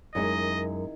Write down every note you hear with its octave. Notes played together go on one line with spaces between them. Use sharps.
F#2 D#3 G#3 E4 D#5